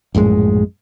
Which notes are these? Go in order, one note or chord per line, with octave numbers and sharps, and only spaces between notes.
A#1 F#2 A2 G#3